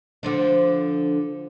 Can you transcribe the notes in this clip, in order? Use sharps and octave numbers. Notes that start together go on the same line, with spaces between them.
D3 F3 D4